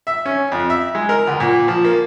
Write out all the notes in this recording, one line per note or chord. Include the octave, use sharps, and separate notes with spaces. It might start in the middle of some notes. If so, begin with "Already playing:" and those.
E5
C#4
F2
E5
G#3
A#4
D2
A#2
F3
A#3